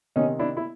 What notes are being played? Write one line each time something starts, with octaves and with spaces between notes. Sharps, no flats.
C3 D#3 C#4 D#4
D4 E4
E4